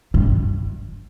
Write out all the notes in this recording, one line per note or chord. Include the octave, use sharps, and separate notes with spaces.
G2